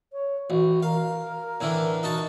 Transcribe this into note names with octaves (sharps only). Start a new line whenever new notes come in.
C#5
A1 F#4
A#4 F5
A2 D3 E3
D#4 F#4 A5